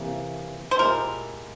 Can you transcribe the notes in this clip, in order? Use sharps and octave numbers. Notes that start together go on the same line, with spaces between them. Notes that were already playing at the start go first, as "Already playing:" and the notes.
Already playing: C3 E3 A#3
C5
A#2 G#3 E4 G4 A#4